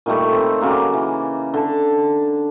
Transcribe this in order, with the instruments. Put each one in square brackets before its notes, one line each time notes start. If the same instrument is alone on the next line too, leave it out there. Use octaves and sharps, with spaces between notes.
[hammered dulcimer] A#2 D#3 G3 A3
C4
C#3 F#3 A#3
E3
D3 A5